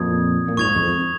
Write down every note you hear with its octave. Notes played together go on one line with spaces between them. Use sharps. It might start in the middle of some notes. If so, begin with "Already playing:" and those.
Already playing: F2 A#2 D#6 G#6
A#2
G#2 C#6 G#6 F7
F2